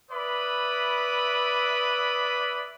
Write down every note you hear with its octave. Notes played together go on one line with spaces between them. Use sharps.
B4 D5 E5 B5 D#6